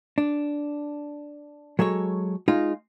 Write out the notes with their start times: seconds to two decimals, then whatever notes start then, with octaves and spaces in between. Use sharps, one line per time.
0.18 D4
1.79 F#3 G#3 A4 C#5
2.48 G#3 D#4 F4